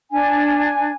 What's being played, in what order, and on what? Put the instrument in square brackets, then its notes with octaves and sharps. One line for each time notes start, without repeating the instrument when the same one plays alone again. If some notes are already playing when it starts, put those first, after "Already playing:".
[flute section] D4 G#5